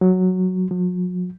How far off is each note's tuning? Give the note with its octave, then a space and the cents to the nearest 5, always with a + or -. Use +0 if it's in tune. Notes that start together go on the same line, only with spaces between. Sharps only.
F#3 +0
F#3 -40